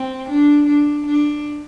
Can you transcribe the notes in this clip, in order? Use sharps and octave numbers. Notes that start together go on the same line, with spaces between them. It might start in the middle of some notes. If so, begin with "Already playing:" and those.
Already playing: C4
D4
D4
D4